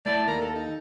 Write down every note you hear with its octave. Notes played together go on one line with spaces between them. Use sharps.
A3 E4 D5 A5
D#2 A#4
A4
D#4